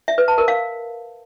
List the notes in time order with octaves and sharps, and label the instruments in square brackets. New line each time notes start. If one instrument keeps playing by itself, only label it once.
[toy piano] E5
B4
A5
A#4
F5